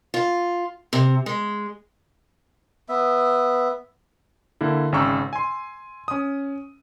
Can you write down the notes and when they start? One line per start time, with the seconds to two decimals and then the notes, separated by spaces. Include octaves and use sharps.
0.14 F4
0.93 C3
1.26 G#3
2.89 B3 E5
4.61 D3 A#3 E4
4.92 G#1 C#3 G5 A#5 C#6 E6
5.33 G#5 C6
6.08 C#4 D#6